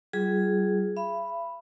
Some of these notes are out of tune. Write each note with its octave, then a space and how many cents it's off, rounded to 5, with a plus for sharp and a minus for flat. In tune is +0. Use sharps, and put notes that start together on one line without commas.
G3 -40 F4 +0 G#4 +0
E5 +45 B5 +0